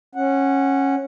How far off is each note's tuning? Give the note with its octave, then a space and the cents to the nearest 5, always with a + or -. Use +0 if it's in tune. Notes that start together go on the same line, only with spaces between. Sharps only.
C#4 -15 F#5 +0